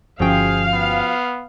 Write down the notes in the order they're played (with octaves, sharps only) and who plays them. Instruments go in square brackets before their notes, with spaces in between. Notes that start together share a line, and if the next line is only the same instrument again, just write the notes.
[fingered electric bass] G1 C#4 [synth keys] F3 F#4 G5 [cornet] G#4 [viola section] F5
[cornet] B3